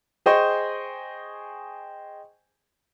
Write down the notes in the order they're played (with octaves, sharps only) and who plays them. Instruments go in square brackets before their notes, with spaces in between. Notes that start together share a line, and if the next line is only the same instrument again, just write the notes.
[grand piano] G#4 C5 D#5 G5 G#5 C#6